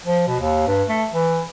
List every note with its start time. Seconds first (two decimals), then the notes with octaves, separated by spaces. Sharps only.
0.04 F3
0.27 B2
0.40 D#2
0.67 G2
0.89 A3
1.13 E3